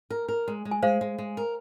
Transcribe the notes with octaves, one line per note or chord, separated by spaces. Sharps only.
A#4
A#4
G#3
G#3
G#5
G#3 C5 F5
G#3
G#3
A#4